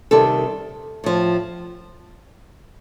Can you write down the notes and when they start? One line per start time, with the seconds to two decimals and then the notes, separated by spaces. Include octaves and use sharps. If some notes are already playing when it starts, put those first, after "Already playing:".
0.11 C3 D#3 G3 A4
1.04 A2 F3